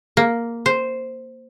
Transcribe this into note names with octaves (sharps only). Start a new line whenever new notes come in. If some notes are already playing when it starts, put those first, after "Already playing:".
A#3
C5